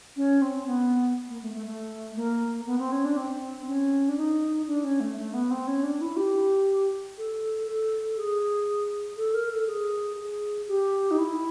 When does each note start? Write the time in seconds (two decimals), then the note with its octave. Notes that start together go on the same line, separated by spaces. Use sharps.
0.16 C#4
0.41 C4
0.67 B3
1.29 A#3
1.42 A3
1.54 A3
1.66 A3
2.16 A#3
2.66 B3
2.79 C4
2.92 C#4
3.05 D4
3.17 C4
3.67 C#4
4.08 D4
4.17 D#4
4.67 D4
4.84 C#4
5.00 A3
5.18 A3
5.33 B3
5.50 C4
5.67 C#4
5.83 D4
6.01 E4
6.16 G4
7.18 A4
7.67 A4
8.17 G#4
9.17 A4
9.34 A#4
9.51 A4
9.67 G#4
10.17 G#4
10.68 G4
11.11 D#4
11.18 E4